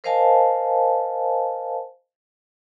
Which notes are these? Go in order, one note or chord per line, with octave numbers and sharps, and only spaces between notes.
A#4 C5 D#5 F5 G#5 A5